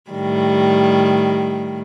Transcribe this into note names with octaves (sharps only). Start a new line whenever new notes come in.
A2 D#3 G3